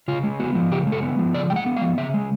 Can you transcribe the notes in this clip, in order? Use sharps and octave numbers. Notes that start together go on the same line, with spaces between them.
C#3 F4
G#3
B3 F#4
F3
C#3 G4
G#3
A4
B3
F3
C#3 D5
G#3 G5
F#5
B3
F5
F3
C#3 E5
G#3